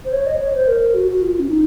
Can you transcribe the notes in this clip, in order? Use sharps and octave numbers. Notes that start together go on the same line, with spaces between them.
C5
C#5
D#5
C#5
C5
A#4
F#4
F#4
F4
C#4
D#4